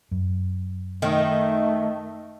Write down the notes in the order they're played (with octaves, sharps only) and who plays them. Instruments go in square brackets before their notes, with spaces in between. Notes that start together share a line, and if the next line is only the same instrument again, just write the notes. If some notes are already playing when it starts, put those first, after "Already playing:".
[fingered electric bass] F#2
[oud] D#3 [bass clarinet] A3